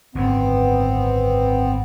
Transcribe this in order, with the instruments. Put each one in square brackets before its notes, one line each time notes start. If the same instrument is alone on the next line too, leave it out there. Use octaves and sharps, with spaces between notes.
[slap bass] G#1 F#2 D3 [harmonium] B3 C4